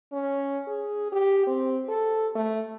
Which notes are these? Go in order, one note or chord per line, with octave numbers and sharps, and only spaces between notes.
C#4
G#4
G4
C4
A4
A3